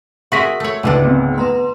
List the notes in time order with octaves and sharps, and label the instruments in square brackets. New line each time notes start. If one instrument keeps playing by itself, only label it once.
[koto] F#4 G#4 A#4 [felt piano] E5 C6 B6 [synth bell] C#6
[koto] A3 C#5 [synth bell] E6
[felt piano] C#2 G#2 [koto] D3 E3 D4
[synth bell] A3 B3 C4
[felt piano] B3 [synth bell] B4 A#5 C6